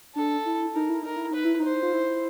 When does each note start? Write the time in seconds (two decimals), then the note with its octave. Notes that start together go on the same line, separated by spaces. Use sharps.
0.15 D4 A4
0.45 E4
0.74 D#4 A#4
0.89 E4
1.03 D#4 A#4
1.16 E4
1.31 D#4 B4
1.45 E4
1.59 D#4 C5
1.83 F4
1.93 E4